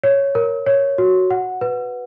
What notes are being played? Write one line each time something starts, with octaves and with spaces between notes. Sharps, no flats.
C#5
A#4
C#5
F#4
F#5
B4